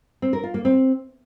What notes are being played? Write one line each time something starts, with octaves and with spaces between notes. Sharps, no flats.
C4
A#4
F4
A#3
C4